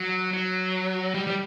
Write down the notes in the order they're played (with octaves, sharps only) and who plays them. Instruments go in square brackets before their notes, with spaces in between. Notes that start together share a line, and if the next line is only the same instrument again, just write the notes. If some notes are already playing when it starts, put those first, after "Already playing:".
Already playing: [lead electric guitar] F#3
F#3
G3
G3